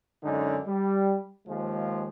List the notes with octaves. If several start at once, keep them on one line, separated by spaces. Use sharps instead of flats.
F#2 D3 G#3 C#4 D#4
G3
D#2 F3 G#3